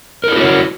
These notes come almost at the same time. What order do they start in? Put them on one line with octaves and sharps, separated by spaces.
A#4 E4 G#4 F#4 C#5